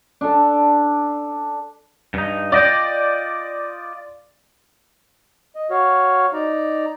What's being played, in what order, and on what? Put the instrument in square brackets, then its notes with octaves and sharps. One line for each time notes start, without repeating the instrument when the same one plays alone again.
[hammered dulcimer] D4 A4
[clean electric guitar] G2 D#4
[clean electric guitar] F4 D#5 G5 [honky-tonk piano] D5
[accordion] D#5
F#4 C#5 F5
D#4 D5 A#5